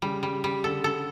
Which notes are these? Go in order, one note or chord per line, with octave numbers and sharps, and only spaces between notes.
C#3 G3
G3
G3
D3 A4
A4